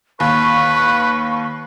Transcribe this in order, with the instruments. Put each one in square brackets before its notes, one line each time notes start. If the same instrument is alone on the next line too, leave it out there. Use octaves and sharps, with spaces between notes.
[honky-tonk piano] D#2 [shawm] B4 [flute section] C#6